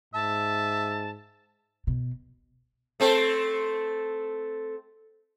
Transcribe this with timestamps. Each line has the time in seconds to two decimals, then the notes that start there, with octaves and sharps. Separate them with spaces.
0.14 G#2 E5 A5
1.87 B2
3.00 A3 C4 A4